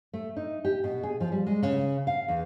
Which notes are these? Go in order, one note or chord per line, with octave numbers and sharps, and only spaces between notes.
A3
D#4
G4
B2
G#4
F3
G3
G#3
C#3
F5
E2